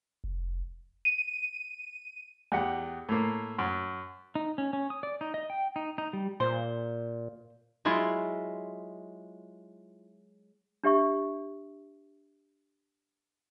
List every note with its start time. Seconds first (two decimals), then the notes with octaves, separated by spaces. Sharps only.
0.24 F1
1.05 D#7
2.52 E2 G4 F#5
3.09 A2 A#3
3.59 F#2
4.35 D#4
4.58 C#4
4.73 C#4
4.90 D#6
5.03 D5
5.21 D#4
5.34 D#5
5.50 G5
5.76 D#4
5.98 D#4
6.13 G3
6.40 A#2 C5
7.85 F#3 G#3 E4 F4
10.84 D4 G4 E5 C#6